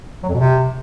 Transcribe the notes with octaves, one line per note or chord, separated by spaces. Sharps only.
F#3
F2
B2
C3